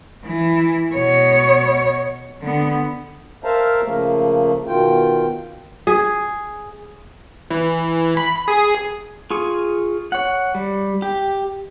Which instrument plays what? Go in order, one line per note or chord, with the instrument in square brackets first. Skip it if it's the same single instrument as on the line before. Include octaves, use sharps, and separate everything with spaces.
[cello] E3
B2 C#5
D3 B3
[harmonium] A#4 C5 E5 F5 A5 A#5
C#3 F3 A3 A#3
B2 D#3 F4 G5
[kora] G#4
[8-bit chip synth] E3
B5
G#4
[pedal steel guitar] F4 G#4 C#6
C#5 F#5
G3
G4